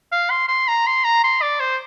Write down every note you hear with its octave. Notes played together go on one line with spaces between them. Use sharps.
F5
C6
C6
A#5
C6
A#5
C6
D5
C5